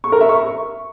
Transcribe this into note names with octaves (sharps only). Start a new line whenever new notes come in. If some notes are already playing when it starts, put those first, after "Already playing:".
C#6
A#4
E5
C#6